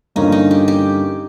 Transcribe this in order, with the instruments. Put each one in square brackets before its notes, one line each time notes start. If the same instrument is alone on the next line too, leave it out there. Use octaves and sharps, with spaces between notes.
[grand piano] G2 D3 F3 A#3 C#4 [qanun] D#4
[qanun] D#4
G4
G4